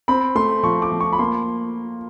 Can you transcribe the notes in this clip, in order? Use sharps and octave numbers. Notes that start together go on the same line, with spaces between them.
C4 B5
A3 C6
F3 C#6
D6
F3
C#6
B5
A#3 C6